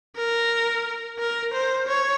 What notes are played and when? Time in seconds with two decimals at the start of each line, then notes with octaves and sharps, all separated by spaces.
0.17 A#4
1.19 A#4
1.54 C5
1.87 C#5